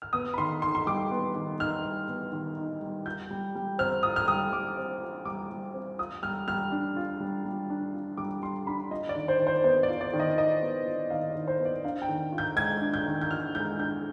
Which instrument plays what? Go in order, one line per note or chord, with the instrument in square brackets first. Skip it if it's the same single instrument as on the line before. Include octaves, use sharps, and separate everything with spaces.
[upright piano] F6
B3 D#6
B5
D#3 C6
D#4 C6
C6
G3 D6
B3
D#3
D#4 F6
G3
B3
D#3
D#4
G3
F4 G6
G3
G3
C4 F6
F4 D#6
F6
G3 D#6
G3 D6
C4
F4
G3 D6
G3
C4
F4 D#6
G3 F6
G3 F6
D4
F4
G3
G3
D4
F4
G3 D6
G3 C6
D4 B5
F4 D#5
D5
D#3
C5
D#3
C5
B3 C5
D5
F4
D5
D#3
D#5
D#3 D#5
B3
F4
D#3 F5
D5
D#3
C5
B3
D5
D4 F5
G5
D#3
F4
G6
G#3 G#6
D4
G6
D#3
G6
F4 F6
G#3 G6
D4 G6